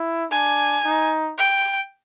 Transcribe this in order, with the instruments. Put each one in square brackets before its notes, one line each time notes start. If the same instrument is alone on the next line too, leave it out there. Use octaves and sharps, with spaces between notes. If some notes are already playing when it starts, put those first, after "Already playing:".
Already playing: [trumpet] E4
[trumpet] D4 [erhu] G#5
[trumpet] D#4
[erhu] G5